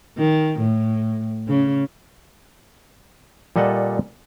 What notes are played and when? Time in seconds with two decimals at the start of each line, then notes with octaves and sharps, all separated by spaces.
0.18 D#3
0.60 A2
1.48 C#3
3.56 A#2 G3 A4 D#5 F#5 A5